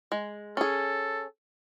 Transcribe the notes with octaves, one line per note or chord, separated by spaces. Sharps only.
G#3
C#4 G#4 A4